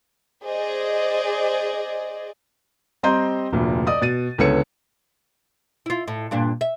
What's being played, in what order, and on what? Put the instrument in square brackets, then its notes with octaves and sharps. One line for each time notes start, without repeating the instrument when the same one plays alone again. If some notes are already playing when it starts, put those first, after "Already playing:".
[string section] G#4 C5 D5 D#5
[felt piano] G3 C4 D#5 A#5 C6 G6
F1 D2 A#2
D5 D#5 D#6
B2 A6 D#7
C#2 D3 B3 A4 C#5 C#7
[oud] E4 F4
A2
G2 A#2 D4
E5